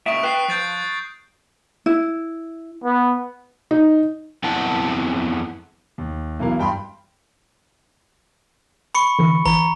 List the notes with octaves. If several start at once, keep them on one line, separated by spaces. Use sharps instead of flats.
C#2 A#2 E5 C#6 D#6 D7
B4 G5 F#6 C7
F3 G6 A6 D7
E4
B3
D#4
F2 B3 C4 E4 F#5 A5
D#2
B1 B2 E3 A#4 F5
G2 G5 B5 C6
B5 C#6 C#7
D3 E3
A1 E3 A#5